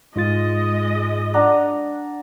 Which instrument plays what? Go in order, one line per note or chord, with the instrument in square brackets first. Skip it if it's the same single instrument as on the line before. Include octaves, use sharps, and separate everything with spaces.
[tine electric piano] G#2 F4 A6 [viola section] G#3 D#5
[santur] D4 F#5 A#5